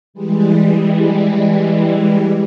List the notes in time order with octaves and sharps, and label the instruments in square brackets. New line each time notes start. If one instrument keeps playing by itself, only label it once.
[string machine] E3 G3 G#3